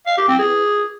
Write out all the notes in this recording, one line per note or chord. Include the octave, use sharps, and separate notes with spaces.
F5
G4
C4
G#4